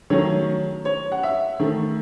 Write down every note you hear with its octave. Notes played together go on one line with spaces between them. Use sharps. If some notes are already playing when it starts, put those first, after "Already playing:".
D#3 F#3 A3 C#5
C#5
F#5
E5
D#3 A3